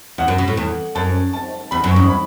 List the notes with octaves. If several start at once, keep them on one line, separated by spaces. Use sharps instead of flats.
E2 F#5
F#2
B2
A2
E2
F#2 A5
A5
E2 B5
F#2
C#6
E2
B5